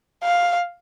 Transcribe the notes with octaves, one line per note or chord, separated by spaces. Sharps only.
F5